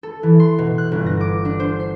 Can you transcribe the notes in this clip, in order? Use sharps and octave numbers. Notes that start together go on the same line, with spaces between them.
A4
E3
C6
B2
F#6
G1
A#6
D6
D4
C5
C7